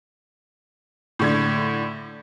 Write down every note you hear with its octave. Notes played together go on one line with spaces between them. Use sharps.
A2 D3 G#6